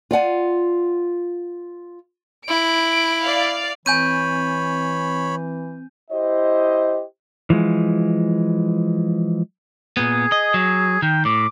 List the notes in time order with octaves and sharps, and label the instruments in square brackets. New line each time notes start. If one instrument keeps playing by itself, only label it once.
[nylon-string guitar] F4 D5 F#5 G#5
[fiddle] E4 [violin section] D7
[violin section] D5 F5
[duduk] E3 [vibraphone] C4 [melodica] C#5 B5 [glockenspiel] G#5 G6 D#7
[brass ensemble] E4 G4 C5 D#5
[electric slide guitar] E3 F3 G#3
[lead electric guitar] A#2 B3 [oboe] G#4
[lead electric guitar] D#5
F#3
[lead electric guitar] D#3 [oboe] G5
[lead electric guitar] A2 [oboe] D6